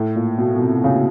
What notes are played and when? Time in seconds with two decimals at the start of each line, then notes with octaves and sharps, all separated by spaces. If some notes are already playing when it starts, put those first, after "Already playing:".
Already playing: A2
0.16 A#2
0.38 B2
0.56 B2
0.61 C3
0.84 C#3